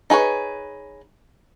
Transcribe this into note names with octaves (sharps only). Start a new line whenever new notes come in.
D#4 G#4 B4 C#5